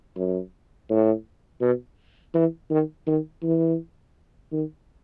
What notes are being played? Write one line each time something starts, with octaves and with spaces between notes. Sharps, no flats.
F#2
A2
B2
E3
D#3
D#3
E3
D#3